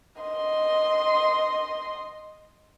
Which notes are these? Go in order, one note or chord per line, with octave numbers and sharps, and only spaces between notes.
D#5 C6